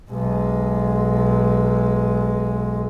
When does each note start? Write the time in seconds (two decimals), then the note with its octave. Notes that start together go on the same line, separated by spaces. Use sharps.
0.11 B1 G#3